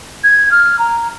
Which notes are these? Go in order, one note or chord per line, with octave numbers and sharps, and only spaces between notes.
G#6
F6
A#5